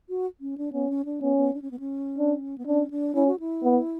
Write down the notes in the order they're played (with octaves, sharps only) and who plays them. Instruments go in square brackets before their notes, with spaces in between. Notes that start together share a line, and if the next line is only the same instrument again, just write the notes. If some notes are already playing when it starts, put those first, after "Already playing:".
[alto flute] F#4
C#4
D4
[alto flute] B3 [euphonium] C#4
[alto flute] C#4
D4
[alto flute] B3 [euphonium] C#4
[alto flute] B3
D4
C#4
B3
C#4
[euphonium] D4
[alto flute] B3
[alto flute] C#4 [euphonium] D4
[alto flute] D4
[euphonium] C#4 [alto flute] E4
[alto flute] F#4
E4
[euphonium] B3